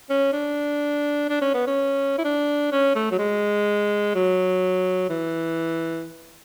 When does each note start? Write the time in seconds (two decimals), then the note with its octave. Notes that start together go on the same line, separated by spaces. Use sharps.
0.09 C#4
0.33 D4
1.29 D4
1.41 C#4
1.54 B3
1.67 C#4
2.18 E4
2.24 D4
2.72 C#4
2.95 A3
3.11 F#3
3.18 G#3
4.15 F#3
5.09 E3